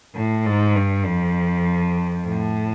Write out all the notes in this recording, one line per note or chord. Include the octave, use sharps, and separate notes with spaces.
A2
G#2
G2
F2
A2